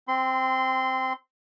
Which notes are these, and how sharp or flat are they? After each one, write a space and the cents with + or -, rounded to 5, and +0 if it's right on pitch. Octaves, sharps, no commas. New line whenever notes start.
C4 +0 C6 -20